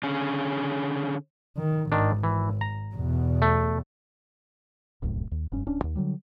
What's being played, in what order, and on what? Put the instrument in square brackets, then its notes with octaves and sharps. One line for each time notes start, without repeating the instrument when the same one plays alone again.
[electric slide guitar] D3 C#4 G#4
[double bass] D#3
[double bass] G#1 [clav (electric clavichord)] D#3 D4
[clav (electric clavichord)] E3
A#5
[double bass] E2 B2
[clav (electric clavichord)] A3
[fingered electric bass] D1 C2 F#2 A2
D#2
F1 G2 C#4
D1 C#4 D4
D#2
D3 D#3 F#3 G3